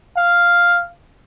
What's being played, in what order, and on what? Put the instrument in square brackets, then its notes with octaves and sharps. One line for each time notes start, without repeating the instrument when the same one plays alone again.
[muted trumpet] F5